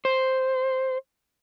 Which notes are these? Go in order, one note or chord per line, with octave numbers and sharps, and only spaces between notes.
C5